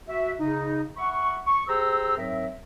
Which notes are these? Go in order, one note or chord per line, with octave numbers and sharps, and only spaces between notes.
F#4 E5
C#3 D#4
E5 F#5 B5 C#6
C#6
G4 G#4 C5 A#5 E6
G#2 F#3 C4 A#4 E5